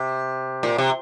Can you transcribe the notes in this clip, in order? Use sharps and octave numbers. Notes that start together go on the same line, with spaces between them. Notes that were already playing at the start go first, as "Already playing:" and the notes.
Already playing: C3
A#2
C3